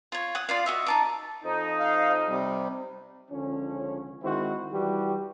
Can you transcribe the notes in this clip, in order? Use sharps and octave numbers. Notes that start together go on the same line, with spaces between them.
F4 C#5
F#5 D#6
F4 D5 F5
F#4 D#5 E5
D#4 A5 D6
F2 F3 D#4
F5
C3 G3
C#2 D3 F3 C#4
D#3 G#3 C4 E4 F#4 C5
E3 G3 F#4 G4